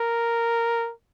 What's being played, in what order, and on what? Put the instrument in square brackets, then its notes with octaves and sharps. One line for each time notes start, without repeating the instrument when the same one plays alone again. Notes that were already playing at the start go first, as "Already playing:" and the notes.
Already playing: [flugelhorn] A#4